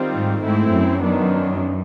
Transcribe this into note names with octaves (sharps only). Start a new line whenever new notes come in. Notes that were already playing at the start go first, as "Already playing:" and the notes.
Already playing: D#3 G3 C4 F4
G#2
G#2 A3 C4 E4
F#2
D#3 F#3 B3 D4